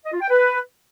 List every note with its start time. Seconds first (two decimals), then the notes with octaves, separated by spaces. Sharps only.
0.05 D#5
0.13 F4
0.21 G5
0.29 B4